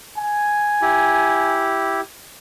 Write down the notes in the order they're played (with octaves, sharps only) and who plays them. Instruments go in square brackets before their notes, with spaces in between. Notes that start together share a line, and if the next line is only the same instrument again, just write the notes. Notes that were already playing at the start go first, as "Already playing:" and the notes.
[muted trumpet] G#5
[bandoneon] E4 G4